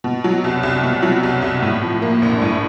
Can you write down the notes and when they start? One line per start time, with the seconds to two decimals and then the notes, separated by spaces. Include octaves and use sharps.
0.04 B2
0.24 F#3
0.44 C2
0.63 C2
0.83 B2
1.03 F#3
1.23 C2
1.42 C2
1.62 A2
1.82 F3
2.02 A#3
2.22 A#1
2.42 A2